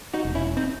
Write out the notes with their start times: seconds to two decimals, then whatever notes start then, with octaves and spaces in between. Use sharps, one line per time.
0.14 D#4 F#4
0.25 E1
0.35 C#4 E4
0.57 C4 D#4